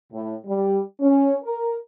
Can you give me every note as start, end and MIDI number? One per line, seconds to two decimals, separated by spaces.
0.13 0.35 45
0.46 0.80 55
1.00 1.34 61
1.44 1.74 70